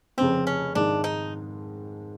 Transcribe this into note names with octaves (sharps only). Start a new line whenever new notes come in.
F1 F2 C#3 C4
C#4
G#2 D#3 G#3 D4
D#4